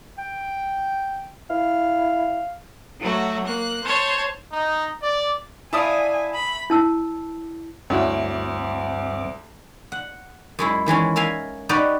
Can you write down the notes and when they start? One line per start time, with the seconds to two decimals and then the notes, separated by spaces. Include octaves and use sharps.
0.18 G5
1.50 E4 F5
3.00 F#3 A3 F#4
3.44 A#3 F#6
3.83 C5 C#5 A5
4.53 D#4
5.01 D5
5.73 E4 D5 E5 F5 G#5 A5 D#6
6.34 B5
6.70 E4 A5 E6
7.90 D2 G2 C4 C#4 E4 F#4 D6
9.92 F#5
10.59 F#2 G#3 E4
10.86 D#3 E3 G#3 C#4
11.16 A#4 E5 F5 G#5
11.69 D#4 F#4 G4 B4 D5